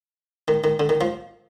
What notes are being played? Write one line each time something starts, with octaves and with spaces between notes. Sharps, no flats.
D#3
D#3
D3
D#3
F3